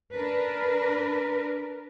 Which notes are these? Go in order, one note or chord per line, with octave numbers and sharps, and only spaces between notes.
D4 A#4 B4